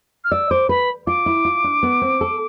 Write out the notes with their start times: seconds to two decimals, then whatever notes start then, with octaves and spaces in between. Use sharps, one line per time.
0.24 F6
0.32 D5 E6
0.51 C5 D6
0.69 B4 B5
1.07 F4 D6
1.26 E4
1.45 F4
1.64 D4
1.83 B3
2.02 C4
2.21 A4